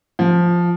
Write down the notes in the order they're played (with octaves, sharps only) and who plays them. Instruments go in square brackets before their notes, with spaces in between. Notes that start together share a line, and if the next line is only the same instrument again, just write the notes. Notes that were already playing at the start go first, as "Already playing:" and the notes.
[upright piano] F3